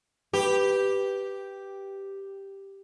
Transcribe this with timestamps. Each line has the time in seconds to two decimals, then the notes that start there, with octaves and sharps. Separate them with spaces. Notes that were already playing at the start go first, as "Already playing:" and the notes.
0.33 G4 B4